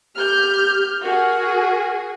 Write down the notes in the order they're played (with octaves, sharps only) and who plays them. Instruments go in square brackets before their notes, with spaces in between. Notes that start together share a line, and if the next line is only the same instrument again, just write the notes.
[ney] G4 [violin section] F6 G6
[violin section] F#4 G#4 [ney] A#4